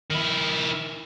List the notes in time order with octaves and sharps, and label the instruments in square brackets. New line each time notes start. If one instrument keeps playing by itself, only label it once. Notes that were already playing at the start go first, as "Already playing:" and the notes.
[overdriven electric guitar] D#3 E4